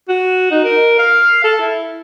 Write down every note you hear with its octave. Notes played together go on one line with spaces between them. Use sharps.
F#4
D#4
A#4
F5
A4
E4